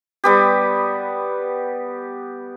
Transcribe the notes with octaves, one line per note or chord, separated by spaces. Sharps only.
G3 B3 G4